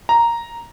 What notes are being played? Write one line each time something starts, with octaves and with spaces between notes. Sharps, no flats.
A#5